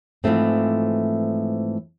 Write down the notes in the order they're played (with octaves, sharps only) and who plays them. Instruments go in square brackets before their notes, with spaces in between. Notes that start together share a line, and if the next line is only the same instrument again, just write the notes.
[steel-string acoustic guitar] G#2 E3 F3 A3 C4